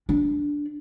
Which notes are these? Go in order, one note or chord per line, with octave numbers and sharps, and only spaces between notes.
D4